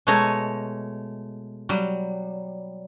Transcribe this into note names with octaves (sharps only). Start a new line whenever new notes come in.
B2 G#3 A3 C#5 A#5
F#3 G3